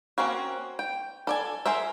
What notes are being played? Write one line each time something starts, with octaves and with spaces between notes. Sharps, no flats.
A#3 C4 C#4 F#4
G5
A4 D5 G#5
G#4 A#4 C5 E5